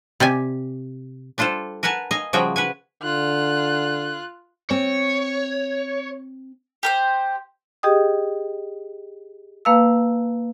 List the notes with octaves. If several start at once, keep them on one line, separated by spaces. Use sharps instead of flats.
C3 G4 D5 G#5
G3 D4 F4 A4 C5
A#4 B4 F#5 G#5 A5
D#5 F5 G#5
C#3 F3 G3 F#4 G#4 G5
B4 F#5 G#5
D3 F4 F#6
C4 C#5
G4 A#4 C5
G4 G#4 D#5 G5 D#6
A#3 B4 F5 A5 E6